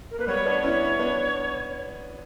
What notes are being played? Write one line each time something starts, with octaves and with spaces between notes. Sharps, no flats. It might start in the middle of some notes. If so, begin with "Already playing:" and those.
A#4
A#3 B4
G3 B3 C#5
B3 D4
C#4 E4 C#5
B3 D4